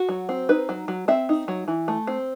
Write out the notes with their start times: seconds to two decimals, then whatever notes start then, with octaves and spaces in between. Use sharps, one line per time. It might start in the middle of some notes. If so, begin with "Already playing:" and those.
Already playing: F#4
0.09 F#3
0.29 C4
0.49 D#4 B4
0.69 F#3
0.88 F#3
1.08 C4 E5
1.29 D#4
1.48 F#3
1.68 E3
1.88 A3
2.07 C4